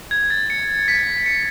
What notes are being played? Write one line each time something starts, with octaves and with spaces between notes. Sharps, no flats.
G#6
A6
C#7
B6
C#7